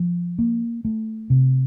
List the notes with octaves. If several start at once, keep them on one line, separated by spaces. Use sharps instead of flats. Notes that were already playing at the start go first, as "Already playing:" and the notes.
Already playing: F3
A#3
A3
C3